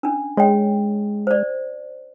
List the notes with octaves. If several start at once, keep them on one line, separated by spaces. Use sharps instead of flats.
C#4 D4
G#3 C#5 G5
C5 D5